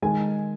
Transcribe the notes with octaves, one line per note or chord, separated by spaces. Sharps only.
D#3 G#3 G#5